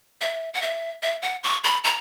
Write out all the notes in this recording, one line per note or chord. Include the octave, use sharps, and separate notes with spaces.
E5
F#5
E5
E5
F#5
C#6
B5
A#5